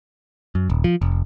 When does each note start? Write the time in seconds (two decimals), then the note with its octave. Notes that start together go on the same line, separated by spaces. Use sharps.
0.55 F#2
0.70 D#1
0.84 F3
1.01 F1